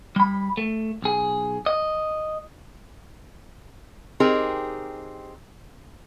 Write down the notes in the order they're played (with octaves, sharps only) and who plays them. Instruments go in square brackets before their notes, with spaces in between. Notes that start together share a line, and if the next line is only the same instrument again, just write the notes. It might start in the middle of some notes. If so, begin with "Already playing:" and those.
[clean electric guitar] G3 B5
A3
B1 G#4
D#5
[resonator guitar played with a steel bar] C4 D#4 G4 G#4 A#4